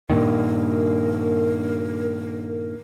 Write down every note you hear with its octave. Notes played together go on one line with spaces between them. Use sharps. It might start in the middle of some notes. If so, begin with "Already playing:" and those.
G2 A#2 D#3 A#4